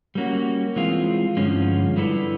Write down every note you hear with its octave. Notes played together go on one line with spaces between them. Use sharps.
G3 A#3 C#4 F#4
E3 G#3 C4 F4
G2 D3 F3 G#3 C#4
D3 G3 B3 E4 A4